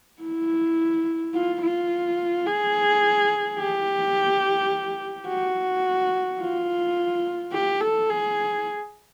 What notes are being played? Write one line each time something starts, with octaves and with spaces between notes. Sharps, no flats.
E4
F4
F4
G#4
G4
F#4
F4
G4
A4
G#4